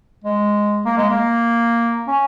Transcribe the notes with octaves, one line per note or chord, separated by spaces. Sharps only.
G#3
A#3
G#3
A#3
C#4